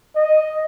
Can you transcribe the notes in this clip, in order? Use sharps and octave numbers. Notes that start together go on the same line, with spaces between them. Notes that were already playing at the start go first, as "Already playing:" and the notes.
D#5